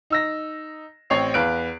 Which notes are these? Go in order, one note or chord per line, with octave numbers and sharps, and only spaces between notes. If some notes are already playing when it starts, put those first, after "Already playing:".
D#4 E6 A#6
A1 C4 C#5 C#6 C7 F7
E2 B4 F5 F#6 D7